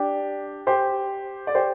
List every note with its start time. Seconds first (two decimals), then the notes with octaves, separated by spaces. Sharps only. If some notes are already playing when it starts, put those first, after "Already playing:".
Already playing: D4 G4
0.67 G4 C5
1.47 D5
1.55 G4 C5